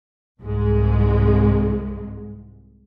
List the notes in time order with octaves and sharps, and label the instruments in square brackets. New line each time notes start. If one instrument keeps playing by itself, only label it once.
[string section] C2 G#2 G#3